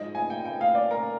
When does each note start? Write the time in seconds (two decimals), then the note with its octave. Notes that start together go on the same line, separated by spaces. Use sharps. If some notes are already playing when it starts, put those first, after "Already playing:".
Already playing: G#2 F3 D#5
0.15 G#5
0.30 G5
0.45 G5
0.61 F5
0.75 D5
0.91 A#4